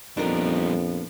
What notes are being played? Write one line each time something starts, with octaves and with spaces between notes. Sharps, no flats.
F2 A#2 F3 G3 B3 D4 D#4 A#4